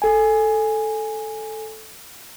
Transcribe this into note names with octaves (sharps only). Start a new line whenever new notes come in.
A4 G#5